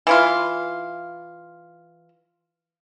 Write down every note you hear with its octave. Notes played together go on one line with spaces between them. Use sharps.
E3 E4 F4